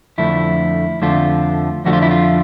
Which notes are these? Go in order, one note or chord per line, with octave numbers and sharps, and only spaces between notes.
F2 D3 F3 A3 D4 E4
F2 D3 F3 A3 D4 F4
F2 D3 F3 A3 D4 F#4
F4
E4
F4